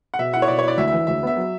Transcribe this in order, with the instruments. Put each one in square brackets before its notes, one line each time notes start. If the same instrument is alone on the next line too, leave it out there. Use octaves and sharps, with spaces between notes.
[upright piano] F#5
[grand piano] B2 [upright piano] E5
[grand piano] E4 [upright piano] F#5
[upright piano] C#5
[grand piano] B2 [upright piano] D5
[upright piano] C#5
[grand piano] E4
[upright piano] D5
[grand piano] D2 [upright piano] E5
[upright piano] E5
[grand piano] E3
[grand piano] D2 [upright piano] E5
[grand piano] B3 [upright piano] E5
[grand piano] F#3